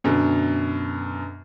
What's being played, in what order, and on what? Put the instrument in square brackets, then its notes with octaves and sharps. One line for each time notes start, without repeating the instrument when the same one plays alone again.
[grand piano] F#2 B2 D3